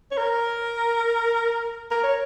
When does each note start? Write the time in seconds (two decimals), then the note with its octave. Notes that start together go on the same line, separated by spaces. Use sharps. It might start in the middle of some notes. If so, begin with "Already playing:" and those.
0.11 C#5
0.17 A#4
1.91 A#4
2.03 C#5